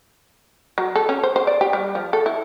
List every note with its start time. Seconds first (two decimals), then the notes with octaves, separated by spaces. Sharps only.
0.78 F#3
0.96 A4
1.09 C#4
1.23 C5
1.36 C5
1.47 D5
1.61 G4
1.73 G3
1.95 F3
2.13 A4
2.26 E4